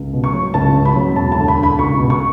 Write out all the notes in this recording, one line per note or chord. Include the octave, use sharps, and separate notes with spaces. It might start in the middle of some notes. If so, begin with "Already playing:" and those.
Already playing: C#2
B2
C#6
F#3
C#2 A5
C#3
B5
F#3
E1 A5
A5
D2
B5
D3
B5
C#2 C#6
B2
C#6